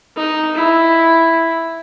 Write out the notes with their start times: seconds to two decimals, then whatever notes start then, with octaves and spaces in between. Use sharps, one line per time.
0.17 D#4
0.55 E4